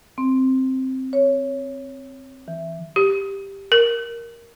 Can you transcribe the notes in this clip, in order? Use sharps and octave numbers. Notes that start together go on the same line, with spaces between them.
C4
C#5
E3
G4
A#4